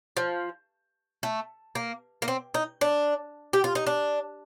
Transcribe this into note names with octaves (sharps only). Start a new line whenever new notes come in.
F3
A3
A#3
A#3
C4
D#4
D4
G4
F4
D#4
D4